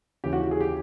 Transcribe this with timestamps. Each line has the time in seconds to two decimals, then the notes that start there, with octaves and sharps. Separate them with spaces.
0.24 D#2 C#3 E3 G4
0.33 F#4
0.51 G#4
0.61 G4